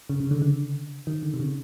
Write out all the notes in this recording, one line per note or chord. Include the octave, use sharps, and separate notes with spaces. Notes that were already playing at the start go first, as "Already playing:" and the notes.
C#3
C#3
D3
D3
D#3
D3
C3
C#3